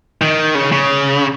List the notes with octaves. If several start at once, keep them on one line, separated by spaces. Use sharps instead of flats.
D#3
C#3
C#3